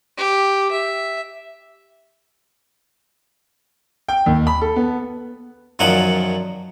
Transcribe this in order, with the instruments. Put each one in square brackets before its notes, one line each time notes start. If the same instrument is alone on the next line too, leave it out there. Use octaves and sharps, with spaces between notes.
[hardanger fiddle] G4
E5
[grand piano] G5
D#2
B5
A4
B3
[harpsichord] F#2 A#2 D#3 F3 F#3 F#5